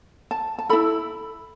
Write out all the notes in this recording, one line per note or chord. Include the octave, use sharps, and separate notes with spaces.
A5
A5
E4 A4 B5